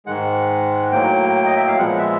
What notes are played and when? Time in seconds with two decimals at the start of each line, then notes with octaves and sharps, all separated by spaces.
0.06 G#2 D#3 G#3 F#5
0.92 A2 F#3 A#3 G5
1.45 D#5
1.56 E5
1.68 F5
1.77 A#2 F3 G#3 B3 F#5
1.99 E5